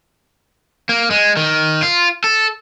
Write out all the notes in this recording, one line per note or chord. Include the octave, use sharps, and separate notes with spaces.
A#3
G#3
D#3
F4
A4